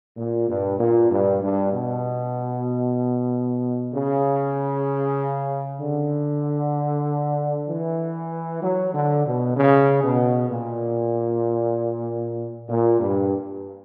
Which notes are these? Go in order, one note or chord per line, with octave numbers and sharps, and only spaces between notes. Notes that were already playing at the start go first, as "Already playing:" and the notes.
A#2
G2
A#2
G2
G2
B2
C#3
D3
E3
F#3
D3
B2
C#3
B2
A#2
A#2
G2